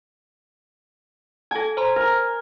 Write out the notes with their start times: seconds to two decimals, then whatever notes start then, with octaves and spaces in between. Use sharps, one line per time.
1.51 A4 G#5 A5
1.77 C5 A#5 C6
1.96 A#4